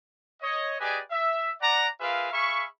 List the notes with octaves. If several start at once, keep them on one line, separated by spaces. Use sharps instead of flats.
C#5 D#5
G4 G#4 B4 D5 D#5 G#5
E5
D5 F#5 A#5
F4 G#4 A#4 B4 E5 F5
G#4 E5 F5 B5 C#6